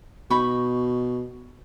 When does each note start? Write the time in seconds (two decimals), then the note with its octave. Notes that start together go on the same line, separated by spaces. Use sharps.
0.30 B2 D#4 B5 C#6